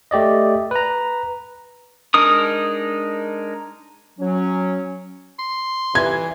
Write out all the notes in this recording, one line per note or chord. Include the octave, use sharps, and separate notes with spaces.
A3 G4 D5 D#5
B4 A#5
G#3 D4 D#4 A#4 D#6
F#3 C#4
C6
E3 G#6